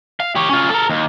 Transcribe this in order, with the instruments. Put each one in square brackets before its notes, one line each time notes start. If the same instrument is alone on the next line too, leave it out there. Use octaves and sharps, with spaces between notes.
[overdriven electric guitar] F5
G4 C#5
C#4 F4
A4 A#4
D#2